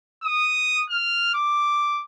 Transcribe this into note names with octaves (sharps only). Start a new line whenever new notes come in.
D#6
F6
D6